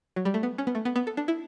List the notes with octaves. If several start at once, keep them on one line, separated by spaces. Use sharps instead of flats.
F#3
G3
A3
B3
C#4
B3
A3
B3
B3
A4
D4
E4